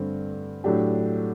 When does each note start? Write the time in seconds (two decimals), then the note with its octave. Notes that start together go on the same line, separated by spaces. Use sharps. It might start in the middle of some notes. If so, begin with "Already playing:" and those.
Already playing: G2 D3 A3 C4
0.64 A2 F#3 A3 D4 G4